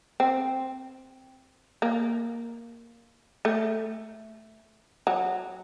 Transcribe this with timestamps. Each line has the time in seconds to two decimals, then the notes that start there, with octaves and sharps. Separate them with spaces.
0.20 C4
1.82 A#3
3.45 A3
5.07 F#3